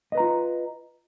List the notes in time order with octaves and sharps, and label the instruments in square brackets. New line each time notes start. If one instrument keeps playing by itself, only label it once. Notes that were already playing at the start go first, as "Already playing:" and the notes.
[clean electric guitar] D#5
B4
A#5
F4